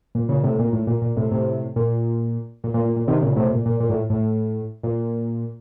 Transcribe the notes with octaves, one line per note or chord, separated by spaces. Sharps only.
A#2
A#2 C#3
A2 C3
A#2
A2
A#2
A#2
A2 C3
A2 C3
A#2
A#2
A#2
A#2
A#2
C3 D#3
A#2 C#3
A2 C3
A#2
A#2
A#2
A2
A2
A#2